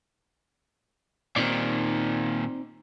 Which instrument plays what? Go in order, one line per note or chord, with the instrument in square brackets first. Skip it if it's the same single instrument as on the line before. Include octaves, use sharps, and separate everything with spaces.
[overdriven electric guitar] A#2 D#3 [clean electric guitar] C4 D#4 D5